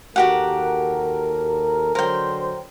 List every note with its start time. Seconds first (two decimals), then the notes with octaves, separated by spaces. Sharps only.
0.16 D#2 F#4 G4 A4 A#4 F#5
1.95 D3 F#3 A#4 C5 G5